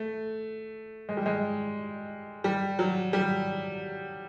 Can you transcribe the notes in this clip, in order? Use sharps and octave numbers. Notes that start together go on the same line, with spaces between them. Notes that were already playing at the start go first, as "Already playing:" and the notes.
Already playing: A3
G#3
G3
G#3
G3
F#3
G3